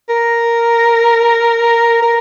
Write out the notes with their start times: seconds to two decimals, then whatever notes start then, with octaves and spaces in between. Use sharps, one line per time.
0.09 A#4
2.02 A#4